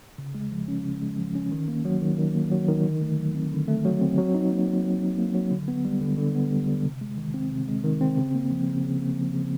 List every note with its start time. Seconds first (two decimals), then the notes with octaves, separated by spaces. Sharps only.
0.18 C#3
0.35 G#3
0.52 F3
0.68 C#4
0.85 C#3
1.02 G#3
1.18 F3
1.35 C#4
1.51 D#3
1.68 A#3
1.85 F#3
2.01 D#3
2.18 D#3
2.35 A#3
2.51 F#3
2.68 D#3
2.84 D3
3.01 A3
3.18 F#3
3.34 C4
3.52 D3
3.68 A3
3.85 F#3
4.02 C4
4.18 F#3
4.34 D#4
4.52 A#3
4.67 F#3
4.84 F#3
5.01 D#4
5.18 A#3
5.35 F#3
5.51 D3
5.68 B3
5.85 G3
6.01 D3
6.18 D3
6.35 B3
6.52 G3
6.68 D3
6.84 C3
7.01 G#3
7.18 D#3
7.34 C4
7.51 C3
7.68 G#3
7.84 D#3
8.01 C4
8.18 C#3
8.35 A#3
8.51 F3
8.68 C#3
8.85 C#3
9.02 A#3
9.18 F3
9.34 C#3